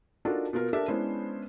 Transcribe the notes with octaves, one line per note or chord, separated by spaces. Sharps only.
D4 D#4 F4 F#4 A4 A#4
B2 F4 A#4
D4 G4 A4 A#4 E5
G#3 B3 C#4 D4 E4 C5